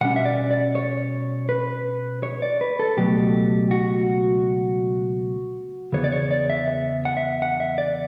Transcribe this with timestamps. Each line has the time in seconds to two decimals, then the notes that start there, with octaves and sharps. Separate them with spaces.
0.01 B2 G3 C#4 F#5
0.16 E5
0.25 D5
0.51 D5
0.75 C#5
1.49 B4
2.23 C#5
2.42 D5
2.61 B4
2.79 A4
2.97 C#2 B2 F#3 A3 G4
3.71 F#4
5.92 E2 C#3 E3 B3 C#5
6.04 D5
6.12 C#5
6.31 D5
6.50 E5
6.68 E5
7.05 F#5
7.17 E5
7.42 F#5
7.60 E5
7.78 D5